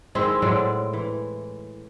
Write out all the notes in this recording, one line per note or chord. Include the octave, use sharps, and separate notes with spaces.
D#3 G#3 C4 E4
A2 F#3 G#3 D5
E3